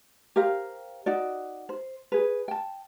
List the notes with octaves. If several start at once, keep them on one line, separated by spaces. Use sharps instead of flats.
G4 A#4 C5 F5
D#4 F#4 D5
C5
G#4 B4
G5 A5